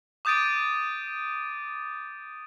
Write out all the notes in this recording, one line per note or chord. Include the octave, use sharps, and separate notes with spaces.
D6 D#6 G6 A6 D7 D#7